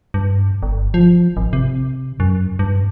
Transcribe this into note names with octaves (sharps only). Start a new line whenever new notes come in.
G2
G1
F3
G#1
C3
F#2
G2